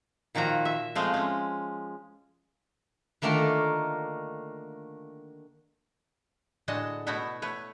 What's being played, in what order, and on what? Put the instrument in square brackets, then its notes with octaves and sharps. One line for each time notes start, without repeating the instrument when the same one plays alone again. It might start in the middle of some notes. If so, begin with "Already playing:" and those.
[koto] A#2 D#3 F3 F#4 A#5
E5
F3 G#3 A3 C4
G#3 C#4
[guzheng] D3 D#3 A3 A#3 F4 A#4
[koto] A2 D3 G#3 F#4 D#5 A5
B2 A3 B3 E4 F#4 E5
A3 B4 C#5